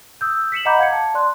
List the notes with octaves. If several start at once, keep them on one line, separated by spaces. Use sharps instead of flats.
D#6 E6 G6
B6 C#7 E7 F#7
D#5 F#5 A#5 B5 D6 G6
F5 G#6 C#7
A5
D5 C6 F#6